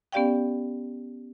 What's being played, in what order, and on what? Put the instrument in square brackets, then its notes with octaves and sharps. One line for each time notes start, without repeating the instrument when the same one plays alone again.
[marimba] B3 C#4 G4 D5 F5 G5